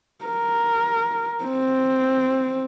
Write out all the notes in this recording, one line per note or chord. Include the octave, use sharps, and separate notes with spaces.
A#4
C4